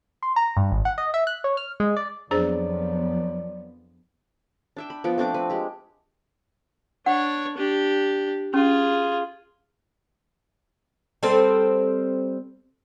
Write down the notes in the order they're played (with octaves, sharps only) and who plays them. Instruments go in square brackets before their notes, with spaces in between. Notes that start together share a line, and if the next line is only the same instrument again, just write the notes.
[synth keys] C6
A#5
G2
G#1
F#5
D#5
E5
F#6
C#5
F6
G#3
D5
[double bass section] F2 F3 B3 [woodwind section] F#3 D5 [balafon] D4 G#4 C5
[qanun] D4 E5 G5
B5
F3 B3 G5
A3 C4 D4 D6
C4 B4
G#3 G4
[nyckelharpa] D4 C#5 [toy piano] F#5
[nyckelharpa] D4 G4
[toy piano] C#4 [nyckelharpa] F4 G#4
[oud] G3 C4 A4